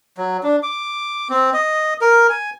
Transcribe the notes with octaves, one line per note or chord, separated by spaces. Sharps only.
F#3
D4
D6
C4
D#5
A#4
G#5